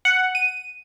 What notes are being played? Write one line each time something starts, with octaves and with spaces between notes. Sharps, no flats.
F#5
D#7